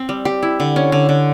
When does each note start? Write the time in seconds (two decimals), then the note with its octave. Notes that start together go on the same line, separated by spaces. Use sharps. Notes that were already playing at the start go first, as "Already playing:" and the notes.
Already playing: C4
0.09 G3
0.25 G4
0.43 E4
0.60 D3
0.76 C#4
0.92 D3
1.09 D3